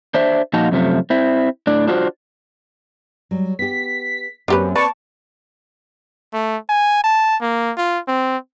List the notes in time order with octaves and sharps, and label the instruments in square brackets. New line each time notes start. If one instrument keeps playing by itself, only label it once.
[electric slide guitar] D4 C5 E5
A#2 F3 D#4 F4 F#4 A5
F#2 C3 F3 A3
C4 E4
A2 D4 D5
D4 F4 F#4 C5
[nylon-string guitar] F#3 G3
[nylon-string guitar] B3 G4 [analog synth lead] B6
[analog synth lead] F#2 [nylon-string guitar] A#3 C4 [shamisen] D4 G4 B4
[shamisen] B4 [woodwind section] D5 C#6 [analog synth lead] A5
[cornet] A3
G#5
A5
A#3
F4
C4